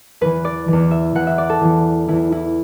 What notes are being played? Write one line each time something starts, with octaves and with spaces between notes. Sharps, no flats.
E2 E3 B4
D5
E2 E3
E5
E2 E3 F#5
E5
D5
A4
E2 E3
E2 E3 E4
E4